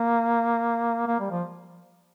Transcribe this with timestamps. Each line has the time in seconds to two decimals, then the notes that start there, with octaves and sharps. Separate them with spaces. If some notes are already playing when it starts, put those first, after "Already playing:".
Already playing: A#3
1.07 A#3
1.20 G3
1.31 F3